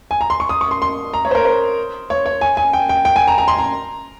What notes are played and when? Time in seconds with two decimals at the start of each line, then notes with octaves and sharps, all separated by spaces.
0.11 G#5
0.21 A#5
0.30 C6
0.40 C#6
0.49 D#6
0.61 C#6
0.71 C6
0.82 C6
1.14 A#5
1.25 C#5
1.31 C5
1.35 A#4
1.45 C5
2.10 C#5
2.26 C#5
2.41 G#5
2.57 G#5
2.73 G5
2.89 G5
3.05 G5
3.16 G#5
3.28 A#5
3.38 A#5
3.48 C6
3.59 A#5